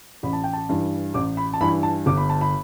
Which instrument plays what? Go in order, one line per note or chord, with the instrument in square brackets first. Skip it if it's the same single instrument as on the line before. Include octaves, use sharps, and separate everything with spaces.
[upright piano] A1 B5
A5
G5
A5
G2 E3
A1 D6
B5
A5
G2 E3 B5
A5
G1 D6
B5
A5
B5